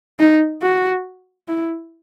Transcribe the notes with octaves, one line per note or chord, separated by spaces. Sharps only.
D#4
F#4
E4